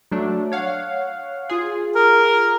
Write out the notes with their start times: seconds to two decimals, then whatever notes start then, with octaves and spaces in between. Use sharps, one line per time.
0.11 F#3 A3 D4
0.52 C#5 F5 F#5
1.49 F4 G#4
1.95 A#4